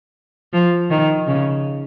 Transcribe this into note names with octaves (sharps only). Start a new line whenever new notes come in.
F3
D#3
C#3